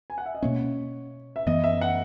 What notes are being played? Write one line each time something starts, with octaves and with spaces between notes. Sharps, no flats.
G#5
F#5
E5
D#5
B2 A#3 C#4 C#5
E5
F#2 E3 B3 D#5
E5
F#5